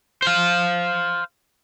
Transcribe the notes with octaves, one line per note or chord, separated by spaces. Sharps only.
C5 F5